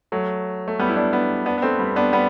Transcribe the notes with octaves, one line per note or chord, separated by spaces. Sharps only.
F#3 A3
A3
G3 B3
E4
B3 D4
B3 D4
B3 D4
B3
A3 C4
G3 B3
B3 D4
G3 B3